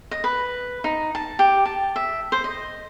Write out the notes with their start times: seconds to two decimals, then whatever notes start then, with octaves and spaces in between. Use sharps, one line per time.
0.11 D#5
0.24 B4
0.84 D#4
1.15 A5
1.39 G4
1.66 A5
1.96 E5
2.32 C5
2.44 D#5